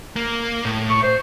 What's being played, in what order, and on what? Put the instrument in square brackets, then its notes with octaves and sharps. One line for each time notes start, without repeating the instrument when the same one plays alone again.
[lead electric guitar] A#3
A2
[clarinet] C#6
C5